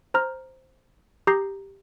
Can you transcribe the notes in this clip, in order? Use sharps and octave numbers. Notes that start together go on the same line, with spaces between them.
C5 A#5 F6
G4 A#5 D#6 G6 A#6 C7